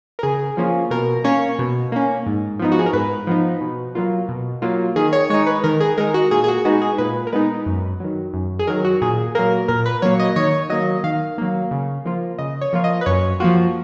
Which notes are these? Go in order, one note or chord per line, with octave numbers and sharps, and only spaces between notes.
A#4
C#3 G#4
F3 A#3 C#4 F4
B2 A#4
A#3 C#4 C#5
B2
A#3 C#4
G#2
F3 B3 D#4
F#4
G#4
A#4
G#2 B4
F3 B3 D#4
B2
F#3 A#3 F4
B2
F#3 A#3 F4
D#3 G#4
C#5
G#3 D#4 C#5
B4
D#3 A#4
G#4
G#3 D#4 A#4
F#4
A#2 G#4
G#4
F#4
G#3 B3 D#4 F#4
G#4
A#2 B4
A#4
G#3 B3 D#4 B4
F#2
D#3 F#3
F#2
G#4
D#3 F#3 A#4
F#4
A#2 G#4
F#3 A#3 A#4
A#2 A#4
B4
F#3 A#3 C#5
D#5
D#3 C#5
F#3 A#3 D#5
D#3 F5
F#3 A#3
C#3
F3 A#3 F4
C#3 D#5
C#5
F3 A#3 F4
D#5
B4
F#2 C#5
F3 A#3 F4 F#4